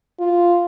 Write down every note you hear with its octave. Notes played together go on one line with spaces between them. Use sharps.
F4